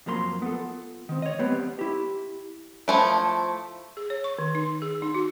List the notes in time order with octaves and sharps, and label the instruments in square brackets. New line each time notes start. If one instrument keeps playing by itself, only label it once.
[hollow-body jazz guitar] F2 F#3 A#3 A#5 C6
B3 F4 A4
D#3 C4
C#5 D#5
G3 B3 C4
E4 G4
[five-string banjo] F3 A3 E4
[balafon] G#4
C#5
C#6
D#3
D#4
G#4
D#4
F#4